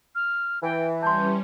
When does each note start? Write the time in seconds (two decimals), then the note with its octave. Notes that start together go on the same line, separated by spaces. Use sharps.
0.15 F6
0.63 E3 G5
1.03 G3 C#4 A5 C6 G6